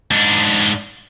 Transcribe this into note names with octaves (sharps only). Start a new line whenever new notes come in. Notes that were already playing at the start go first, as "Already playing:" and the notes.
G#2 D4